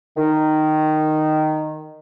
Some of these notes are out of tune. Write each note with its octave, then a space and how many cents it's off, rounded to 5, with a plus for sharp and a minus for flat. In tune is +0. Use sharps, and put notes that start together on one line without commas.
D#3 -10